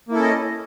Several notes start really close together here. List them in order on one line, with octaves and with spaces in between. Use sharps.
A#3 E4 A4 C#4 D#5